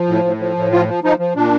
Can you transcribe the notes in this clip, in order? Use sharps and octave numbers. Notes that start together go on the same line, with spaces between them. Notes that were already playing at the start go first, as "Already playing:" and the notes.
Already playing: F3
A2
A2
F3
A2
F3 F4
F3
F3 D#4
F3
A#2 D4